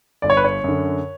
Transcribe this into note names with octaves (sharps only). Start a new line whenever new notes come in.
G1 D5
C#5
B4
C#5
F#2 D3